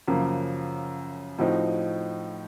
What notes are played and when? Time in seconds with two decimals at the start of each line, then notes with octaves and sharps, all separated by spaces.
0.08 F#2 C#3 F3 A#3
1.39 A2 F3 C4 D#4 F#4